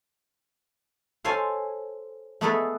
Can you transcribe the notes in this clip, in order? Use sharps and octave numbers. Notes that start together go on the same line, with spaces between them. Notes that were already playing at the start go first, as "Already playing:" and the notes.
A4 C5 C#5 F5 G#5
A3 B3 E4 G#4 A4 B4